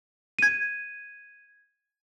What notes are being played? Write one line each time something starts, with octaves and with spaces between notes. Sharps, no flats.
G#6 D#7